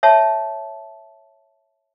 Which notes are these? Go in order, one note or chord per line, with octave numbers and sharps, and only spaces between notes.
C#5 E5 A5